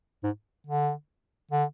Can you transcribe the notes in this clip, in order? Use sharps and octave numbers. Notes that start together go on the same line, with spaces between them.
G#2
D3
D3